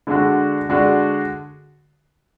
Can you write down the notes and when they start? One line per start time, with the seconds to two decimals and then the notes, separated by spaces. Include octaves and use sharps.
0.07 D3 G#3 D4 F#4
0.69 D3 G#3 D4 F#4